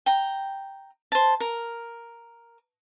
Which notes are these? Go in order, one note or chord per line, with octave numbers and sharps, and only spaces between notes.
G5 A#5
C5 A5
A#4